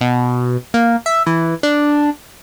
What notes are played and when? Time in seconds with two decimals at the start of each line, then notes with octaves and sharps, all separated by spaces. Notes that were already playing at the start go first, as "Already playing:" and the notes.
0.01 B2
0.74 A#3
1.06 E5
1.26 E3
1.63 D4